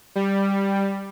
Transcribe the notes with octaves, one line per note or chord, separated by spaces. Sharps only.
G3